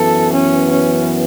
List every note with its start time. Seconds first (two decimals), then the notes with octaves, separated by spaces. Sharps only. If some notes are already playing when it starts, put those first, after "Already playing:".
Already playing: F#2 E3 B3 A4
0.33 C#4
0.71 C#4